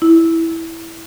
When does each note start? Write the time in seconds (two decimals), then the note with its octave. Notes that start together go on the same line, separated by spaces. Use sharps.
0.02 E4